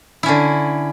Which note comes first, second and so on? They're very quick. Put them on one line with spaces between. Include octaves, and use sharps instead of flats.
E4 C#4 D3